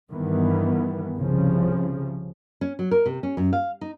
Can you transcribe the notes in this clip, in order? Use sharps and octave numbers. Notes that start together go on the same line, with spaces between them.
G2 D#3 E3 B3
C2 C#3 F3
C#4
F#3
A#4
C3
C#4
F#2
F5
D#4